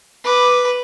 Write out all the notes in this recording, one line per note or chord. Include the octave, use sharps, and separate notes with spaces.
B4 D6